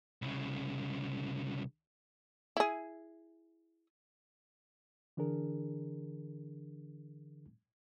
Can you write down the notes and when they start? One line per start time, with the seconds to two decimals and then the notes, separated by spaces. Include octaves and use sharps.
0.22 C2 C#3
2.57 E4 G#4
5.17 D3 E3 D4 G#4 A#4